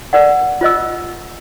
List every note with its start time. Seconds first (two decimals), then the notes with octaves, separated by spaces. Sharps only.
0.13 A#4 D5 F#5
0.61 F4 C5 D#5 E6